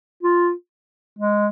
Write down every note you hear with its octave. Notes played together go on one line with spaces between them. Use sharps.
F4
G#3